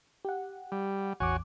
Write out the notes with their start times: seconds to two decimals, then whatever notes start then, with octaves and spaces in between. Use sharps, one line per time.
0.25 G4 F#5
0.72 G3
1.20 A1 E2 F#4 C#5 G#5 D6